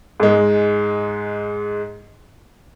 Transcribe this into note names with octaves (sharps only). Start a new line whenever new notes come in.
G#2 G#3